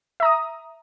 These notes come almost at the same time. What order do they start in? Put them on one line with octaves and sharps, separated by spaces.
E5 A#5 D#6